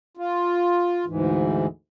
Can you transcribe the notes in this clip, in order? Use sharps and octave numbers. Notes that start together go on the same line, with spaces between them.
F4
D2 G#2 E3